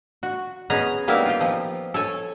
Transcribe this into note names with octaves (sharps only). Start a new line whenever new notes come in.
F#4
B3 C#4 G#4 D#5 A#5
G3 A#3 B3 D#4 E4 A#4
F4 G4
F3 D#5
A4 C#5 G#5